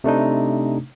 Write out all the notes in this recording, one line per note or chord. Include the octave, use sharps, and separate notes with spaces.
C3 A3 D4 D#4